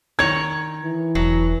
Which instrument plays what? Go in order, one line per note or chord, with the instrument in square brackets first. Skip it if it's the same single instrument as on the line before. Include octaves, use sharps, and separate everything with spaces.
[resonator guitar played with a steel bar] D#3 C#5 [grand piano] G#6
[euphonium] E3
[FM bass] E1 [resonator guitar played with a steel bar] F#3